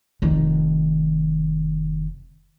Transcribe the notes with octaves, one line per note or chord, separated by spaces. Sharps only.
F1 D#3